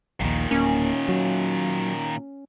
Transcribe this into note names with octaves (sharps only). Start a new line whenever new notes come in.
A#1 D#2 A#2 D#3
D1 A#3 C#4
F#3